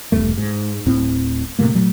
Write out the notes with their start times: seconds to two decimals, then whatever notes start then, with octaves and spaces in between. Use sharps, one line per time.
0.12 E1 C2 G2 A3
0.38 G#2
0.86 D1 A2 C4
1.59 A2 C3 A3 A#3
1.75 A#2 F#3 A3